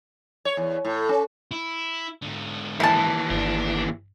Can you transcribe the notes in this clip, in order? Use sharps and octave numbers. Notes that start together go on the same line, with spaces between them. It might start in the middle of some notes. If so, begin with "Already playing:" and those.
C#5
E2
A2
C#4
E4
G#2 D3
D#2 E3 E4 A5
G1 D4